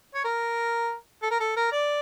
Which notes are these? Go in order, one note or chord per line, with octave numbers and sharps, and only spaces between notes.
C#5
A#4
A4
A#4
A4
A#4
D5